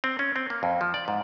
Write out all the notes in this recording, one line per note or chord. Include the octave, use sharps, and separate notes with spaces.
C4
C#4
C4
A#3
F2
F3
D5
G#2